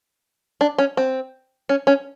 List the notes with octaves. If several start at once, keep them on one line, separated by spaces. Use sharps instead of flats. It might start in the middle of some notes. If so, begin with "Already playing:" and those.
D4
C#4
C4
C#4
C#4